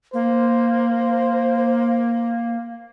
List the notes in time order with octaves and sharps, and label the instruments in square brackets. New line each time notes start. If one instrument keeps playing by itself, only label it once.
[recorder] A#3 [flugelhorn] C5